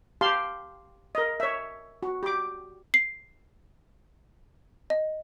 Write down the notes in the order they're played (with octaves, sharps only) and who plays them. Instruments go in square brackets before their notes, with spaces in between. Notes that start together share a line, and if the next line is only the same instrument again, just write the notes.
[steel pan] G4 F5 A5 C6
A#4 D#5
C#5 E5
F#4
G4 D6
[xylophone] C7
D#5